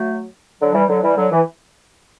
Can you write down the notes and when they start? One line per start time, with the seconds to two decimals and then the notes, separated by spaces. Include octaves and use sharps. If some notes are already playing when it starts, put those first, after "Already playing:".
Already playing: F#3 A3
0.60 D3 F#3
0.73 E3 G3
0.88 D3 F#3
1.02 E3 G3
1.16 D3 F#3
1.31 E3